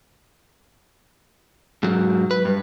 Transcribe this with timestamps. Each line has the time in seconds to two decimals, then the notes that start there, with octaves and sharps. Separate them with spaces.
1.83 G#2 F#3
2.31 B4
2.45 G2